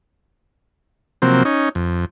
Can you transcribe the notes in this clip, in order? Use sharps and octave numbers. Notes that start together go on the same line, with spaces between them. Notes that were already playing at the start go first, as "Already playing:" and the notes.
C3 F3 F#3 A#3 C4
C#4 D#4
F2